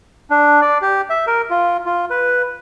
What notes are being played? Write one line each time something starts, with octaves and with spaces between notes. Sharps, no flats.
D4
D5
G4
E5
A#4
F4
F4
B4